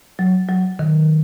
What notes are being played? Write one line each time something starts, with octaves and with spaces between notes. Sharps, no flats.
F#3
F#3
D#3